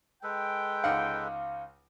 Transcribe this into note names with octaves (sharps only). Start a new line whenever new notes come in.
G#3 A4 B4 G5
C#2 D#4 F5 F#5